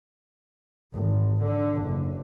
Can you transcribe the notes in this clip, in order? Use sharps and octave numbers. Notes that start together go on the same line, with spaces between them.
G#1
D3
F#1